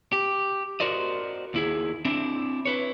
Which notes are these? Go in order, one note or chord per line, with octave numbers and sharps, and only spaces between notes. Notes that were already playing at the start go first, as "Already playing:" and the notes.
G4
F#4 A#4 C5 D5 D#5
D#2 E4 G#4
C4 D4 E4
E4 B4 C#5